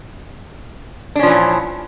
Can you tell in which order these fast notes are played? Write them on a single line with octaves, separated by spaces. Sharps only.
D4 C#4 F3 E3 A#2